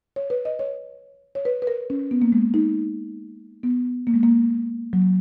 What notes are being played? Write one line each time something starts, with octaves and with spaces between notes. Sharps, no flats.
C#5
B4
D#5
C#5
C#5
B4
B4
A#4
C#4
B3
A#3
G#3
D#4
B3
A#3
G#3
A#3
F#3